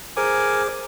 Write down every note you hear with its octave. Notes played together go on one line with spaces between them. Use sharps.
G#4 A#4 C5 G#5 D6